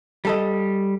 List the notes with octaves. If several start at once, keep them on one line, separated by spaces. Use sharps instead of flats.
G3 A4 D#5